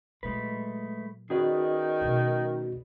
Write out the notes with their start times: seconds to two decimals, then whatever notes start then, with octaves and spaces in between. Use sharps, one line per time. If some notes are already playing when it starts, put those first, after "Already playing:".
0.23 A#2 F#3 G#3 A3 B4
1.30 D#3 C#4 F#4 G#4 B4 D5 D#5
2.01 B2 A3